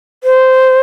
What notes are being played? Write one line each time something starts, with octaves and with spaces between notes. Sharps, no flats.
C5